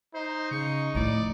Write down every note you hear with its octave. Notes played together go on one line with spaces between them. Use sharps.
D#4 C5
C#3 C#6
D2 A2 F3 D5